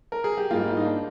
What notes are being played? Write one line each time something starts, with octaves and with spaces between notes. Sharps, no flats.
A#4
G#4
G4
G#2 G3 A#3 F4
F4
D#4
D4